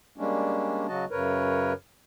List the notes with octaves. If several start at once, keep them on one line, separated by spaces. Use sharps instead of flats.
G3 G#3 A#3 C#4 D4
C#3 F#3 F#4 D#5 A5
F#2 C#3 A#4 B4 C#5